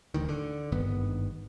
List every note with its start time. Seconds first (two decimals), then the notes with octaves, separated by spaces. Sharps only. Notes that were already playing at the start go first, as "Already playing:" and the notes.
0.14 D1 D2 D#3
0.29 D3
0.72 G#1 G2 D#3 B3